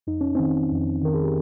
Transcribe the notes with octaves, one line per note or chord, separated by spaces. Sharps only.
F2 D#4
C#4
D#3 C4 D#4
F2
D#3 A#4
G#4
G4